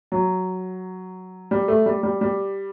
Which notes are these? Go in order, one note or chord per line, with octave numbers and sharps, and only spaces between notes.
F#3
G3
A3
G3
G3
G3